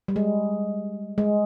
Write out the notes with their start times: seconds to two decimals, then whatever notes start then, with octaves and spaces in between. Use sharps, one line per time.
0.08 G3
0.16 G#3
1.18 G#3